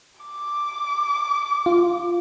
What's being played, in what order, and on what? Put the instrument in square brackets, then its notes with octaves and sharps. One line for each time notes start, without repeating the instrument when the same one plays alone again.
[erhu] D6
[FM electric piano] F4